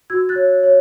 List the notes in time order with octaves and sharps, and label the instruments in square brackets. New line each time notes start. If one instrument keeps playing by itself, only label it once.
[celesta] F#4 E6 G#6
F#6 A6
C#5
C#5